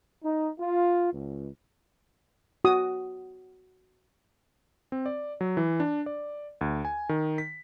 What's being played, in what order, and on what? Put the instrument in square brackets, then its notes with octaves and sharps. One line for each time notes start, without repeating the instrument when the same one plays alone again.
[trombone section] D#4
F4
C#2
[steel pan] F#4 D#6
[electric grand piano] C4
D5
F#3
E3
D4
D5
D2
G#5
D#3
B6